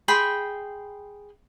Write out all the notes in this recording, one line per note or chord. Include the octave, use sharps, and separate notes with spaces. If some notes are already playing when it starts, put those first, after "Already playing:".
G#4 G5 B5 C6